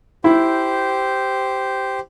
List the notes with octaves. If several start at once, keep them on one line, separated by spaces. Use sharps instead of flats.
E4 G4 C5